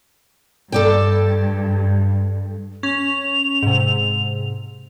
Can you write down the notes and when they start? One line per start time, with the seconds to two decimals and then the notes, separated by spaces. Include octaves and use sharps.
0.72 G2 A4 D5 G5
2.83 C#4 F7
3.63 G#2 C3